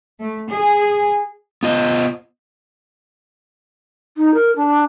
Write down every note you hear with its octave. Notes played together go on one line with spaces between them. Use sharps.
A3
G#4
B3 F4 D#5
D#4
A#4
D4